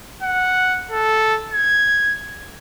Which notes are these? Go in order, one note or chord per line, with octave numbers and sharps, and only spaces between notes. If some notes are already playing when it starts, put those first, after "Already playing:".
F#5
A4
G#6